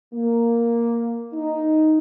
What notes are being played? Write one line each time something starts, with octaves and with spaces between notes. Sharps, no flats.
A#3
D#4